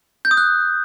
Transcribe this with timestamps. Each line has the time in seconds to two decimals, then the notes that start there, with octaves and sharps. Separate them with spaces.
0.25 G6
0.31 D#6
0.37 F#6